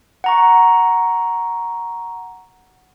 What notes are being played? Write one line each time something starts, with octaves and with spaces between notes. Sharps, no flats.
F#5 A#5 C#6